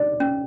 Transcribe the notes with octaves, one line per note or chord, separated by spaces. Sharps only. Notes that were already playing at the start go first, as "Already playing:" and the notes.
Already playing: D5
C#4